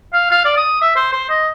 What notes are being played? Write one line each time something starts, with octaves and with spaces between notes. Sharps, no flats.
F5
F5
D5
D#6
E5
C5
C5
D#5